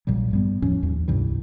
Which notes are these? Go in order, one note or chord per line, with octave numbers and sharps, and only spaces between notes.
A#1 A#2 F#3 G3
G2 G3 B3
E2 A2 F3 C#4
D#2
C#2 G2 C3 E3